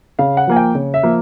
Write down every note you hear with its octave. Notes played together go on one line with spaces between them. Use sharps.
C#3 F5
F#5
F3 A#3 G#5
G5
C#3
E5
F3 A#3